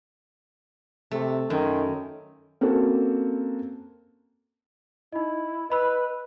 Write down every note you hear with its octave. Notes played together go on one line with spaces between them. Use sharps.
C3 A3
F#2 D#3
A#3 C4 C#4 F#4 A4
D#4 E4 D#5
B4 D#5 B5 E6